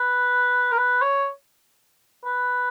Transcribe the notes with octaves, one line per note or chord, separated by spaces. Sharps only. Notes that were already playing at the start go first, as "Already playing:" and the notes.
Already playing: B4
A#4
B4
C#5
B4